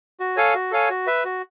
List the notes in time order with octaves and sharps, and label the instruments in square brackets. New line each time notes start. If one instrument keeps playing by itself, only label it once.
[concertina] F#4
A4 C#5 F5 G#5
F#4
A4 C#5 F5 G#5
F#4
B4 E5
F#4